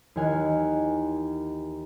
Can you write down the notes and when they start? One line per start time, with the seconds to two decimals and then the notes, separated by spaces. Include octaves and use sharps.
0.16 D#2 E3 D#5 G#5 F6 F#6